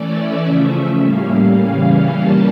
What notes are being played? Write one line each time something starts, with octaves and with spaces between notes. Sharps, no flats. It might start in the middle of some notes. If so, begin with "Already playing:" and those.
Already playing: E3 A3 C#4 D5
E5
C#3 F3 A3 C#4 E5
E5
A2 G3 A#3 C#4 F5
C#3 E3 G3 C#4
A#2 G3 A#3 C#4 A5